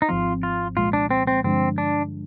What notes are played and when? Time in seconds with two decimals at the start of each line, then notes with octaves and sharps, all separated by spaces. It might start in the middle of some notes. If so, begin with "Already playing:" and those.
0.02 D#4
0.08 G#1 G#2 F3 C4 F4
0.43 F4
0.77 C2 A#2 F3 G#3 F4
0.93 D4
1.11 C4
1.27 C4
1.44 G2 D3 F3 G#3 C4 D4
1.78 D4